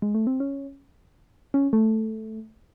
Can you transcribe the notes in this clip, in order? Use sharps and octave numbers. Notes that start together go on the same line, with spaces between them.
G#3
A3
C4
C#4
C#4
A3